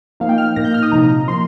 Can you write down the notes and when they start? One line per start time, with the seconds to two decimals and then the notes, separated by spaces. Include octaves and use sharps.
0.20 F3 A#3 D#4 F5
0.29 G5
0.38 F6
0.56 A#2 A#3 D#4 A#6
0.65 G6
0.74 F6
0.83 D#6
0.92 C3 F3 D#4 A#5
1.28 F3 A#3 C6